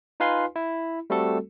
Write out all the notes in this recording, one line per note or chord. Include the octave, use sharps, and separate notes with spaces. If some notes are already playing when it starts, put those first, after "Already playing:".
D#4 F4 B4 F5 G#5 C6
E4
G3 A3 C4 F#4 A4